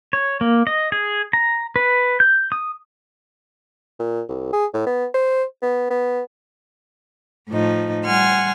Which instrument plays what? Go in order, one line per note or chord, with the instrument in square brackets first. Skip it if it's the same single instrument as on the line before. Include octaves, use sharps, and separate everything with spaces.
[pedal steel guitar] C#5
A#3
D#5
G#4
A#5
B4
G6
D#6
[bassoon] A#2
C2
G#4
A2
B3
C5
B3
B3
[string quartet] A2 F3 D#4
G3 F#5 G#5 C6 F6